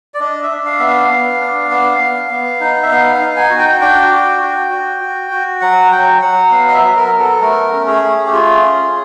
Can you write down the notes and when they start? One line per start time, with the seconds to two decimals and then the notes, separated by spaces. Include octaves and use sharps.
0.14 D5
0.20 D4 D#5
0.43 E5
0.51 D4
0.66 F5
0.79 B3 E5
0.88 F5
1.11 B3
1.40 D4
1.71 B3
2.01 B3
2.31 B3
2.61 D#4
2.83 E5
2.91 B3 F5
3.13 F5
3.21 D#4
3.36 G#5
3.50 F#4
3.59 G5
3.81 D4 G5
4.11 F#4
4.41 F#4
4.70 F#4
5.01 F#4
5.31 F#4
5.61 F#3 F#5
5.91 F#3 G5
6.22 F#3 F#5
6.51 B3 F5
6.68 D#5
6.74 E5
6.82 F#3
6.96 A#4
7.12 B3
7.19 A4
7.41 A3 A#4
7.71 C#4
7.87 G#4
8.02 A3
8.26 G4
8.32 F4 G#4
8.62 C#4